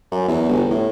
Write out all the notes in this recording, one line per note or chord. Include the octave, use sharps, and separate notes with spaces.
F#2
E2
G1
A2